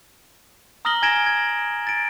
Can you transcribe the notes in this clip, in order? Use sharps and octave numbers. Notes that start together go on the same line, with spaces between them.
A#5 D#6 F6 A#6 F#7 G7
G#5 G#6 A#6 D7 E7
G#6
A6 D7